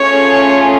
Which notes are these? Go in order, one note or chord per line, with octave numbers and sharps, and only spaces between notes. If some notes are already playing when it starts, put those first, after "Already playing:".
Already playing: A3 C#4 F4 G#4 C#5